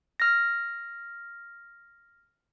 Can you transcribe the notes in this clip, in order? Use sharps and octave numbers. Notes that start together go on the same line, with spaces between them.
F6 A#6